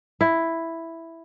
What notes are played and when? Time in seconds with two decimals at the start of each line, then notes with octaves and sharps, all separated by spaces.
0.21 E4